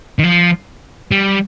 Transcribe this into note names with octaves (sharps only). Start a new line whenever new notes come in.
D#3
F3
G3